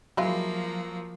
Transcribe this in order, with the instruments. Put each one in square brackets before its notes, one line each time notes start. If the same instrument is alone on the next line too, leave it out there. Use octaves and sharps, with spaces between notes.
[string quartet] F3 A#3 [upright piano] F#3 [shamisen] G#3 E4 F4